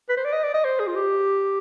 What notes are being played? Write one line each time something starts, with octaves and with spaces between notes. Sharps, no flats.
B4
C5
D5
D#5
D5
D#5
C5
G#4
F4
G4